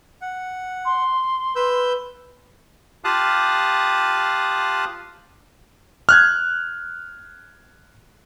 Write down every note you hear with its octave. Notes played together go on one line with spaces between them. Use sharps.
F#5
C6
B4 E6 G6
F4 G4 F5 A5 D#6 F#6
F6 F#6 G#6